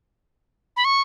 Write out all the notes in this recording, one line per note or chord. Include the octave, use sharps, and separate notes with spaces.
B5
C#6